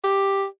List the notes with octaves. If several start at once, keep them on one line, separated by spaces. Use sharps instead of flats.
G4